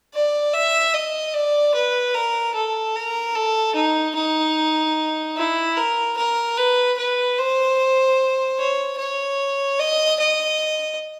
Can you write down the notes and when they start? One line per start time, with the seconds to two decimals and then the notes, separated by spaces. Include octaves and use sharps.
0.14 D5
0.54 E5
0.94 D#5
1.34 D5
1.74 B4
2.15 A#4
2.55 A4
2.96 A#4
3.35 A4
3.75 D#4
4.15 D#4
5.36 E4
5.77 A#4
6.17 A#4
6.57 B4
6.98 B4
7.38 C5
8.58 C#5
8.98 C#5
9.79 D#5
10.19 D#5